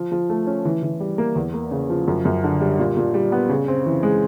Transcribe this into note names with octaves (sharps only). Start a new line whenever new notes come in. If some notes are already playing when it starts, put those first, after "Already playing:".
Already playing: F3
F3
A3
C#4
E3
E3
G3
A#3
E2
A#3
C#3
F3
F#2
F#2
D3
G3
A#2
A#2
G3
B3
C#3
C4
E3
G#3